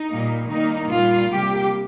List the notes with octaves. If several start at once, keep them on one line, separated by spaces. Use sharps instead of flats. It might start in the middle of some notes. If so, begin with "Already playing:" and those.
Already playing: D#4
A#2 G3 A#3
D#3 G3 A#3 D#4
A#2 G3 A#3 F4
C3 G3 A#3 G4